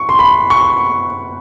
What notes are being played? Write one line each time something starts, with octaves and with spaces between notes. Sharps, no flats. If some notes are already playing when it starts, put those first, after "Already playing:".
Already playing: C#6
C6
B5
C#6